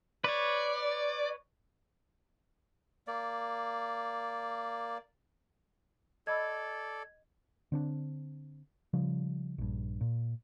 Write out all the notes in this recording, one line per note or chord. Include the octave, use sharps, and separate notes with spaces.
B4 C#5 D5
A#3 D5
A4 D5 D#5 B5 E6 G#6
D3 C4 D4
C#3 F3 G3
A#1 G2
A#2